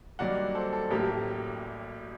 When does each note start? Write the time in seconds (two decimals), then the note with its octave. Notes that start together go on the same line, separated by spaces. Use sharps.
0.19 G2 D#3 F#3 A#3 D5 F#5
0.55 A4 C5
0.73 A4
0.91 A1 A2 F#3 A#3 G4 A#4